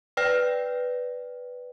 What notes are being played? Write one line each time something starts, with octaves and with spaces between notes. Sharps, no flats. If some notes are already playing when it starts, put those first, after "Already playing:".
B4 D5 G5 F6 A#6